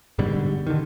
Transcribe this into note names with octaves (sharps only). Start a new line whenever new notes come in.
G#2 B2 D3 G3
D3 D#3